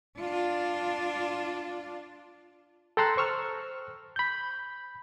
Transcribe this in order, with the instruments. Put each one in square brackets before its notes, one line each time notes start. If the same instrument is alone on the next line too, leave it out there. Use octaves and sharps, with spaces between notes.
[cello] D4 F4
[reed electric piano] A4 G5 A#5 C6 E6 F#6
C5 C#6 E6 F6
B5 G6